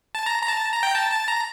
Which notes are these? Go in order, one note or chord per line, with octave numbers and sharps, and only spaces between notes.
A5
A#5
A#5
A5
A#5
G5
A5
A5
A#5